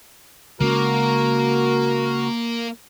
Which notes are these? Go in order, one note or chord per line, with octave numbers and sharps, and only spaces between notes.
C#3 G#3 A#3 C#4 F#4 A#4